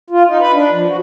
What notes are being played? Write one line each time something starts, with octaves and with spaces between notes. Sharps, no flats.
F4
D#4
B4
D4
F3
F#4